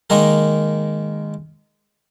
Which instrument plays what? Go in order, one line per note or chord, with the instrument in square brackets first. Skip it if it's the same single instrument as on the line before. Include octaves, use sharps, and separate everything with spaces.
[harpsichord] D#3 G#3 A#3 A#4